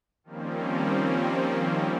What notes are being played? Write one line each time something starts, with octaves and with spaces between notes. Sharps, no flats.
D#3 F3 G3 A#3 C4 C#4